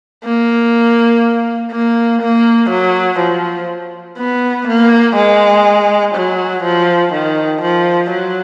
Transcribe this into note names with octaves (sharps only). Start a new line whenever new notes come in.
A#3
A#3
A#3
F#3
F3
B3
A#3
G#3
F#3
F3
D#3
F3
F#3